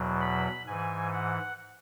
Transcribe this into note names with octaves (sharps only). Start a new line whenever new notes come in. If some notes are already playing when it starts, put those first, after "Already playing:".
Already playing: E2 B2 F#3
B5
G#2 E3 G#5
F#5